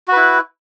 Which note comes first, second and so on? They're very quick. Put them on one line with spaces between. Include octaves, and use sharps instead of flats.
F#4 B4 E4